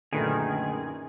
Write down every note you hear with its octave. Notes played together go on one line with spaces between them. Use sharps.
F#2 A#2 D3 D#3 A3 G#4 B4